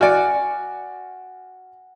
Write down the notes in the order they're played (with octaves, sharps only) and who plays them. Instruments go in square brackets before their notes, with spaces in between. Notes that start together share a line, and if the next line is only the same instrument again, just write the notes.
[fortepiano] F#4 D5 [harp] F#5 G#5 F6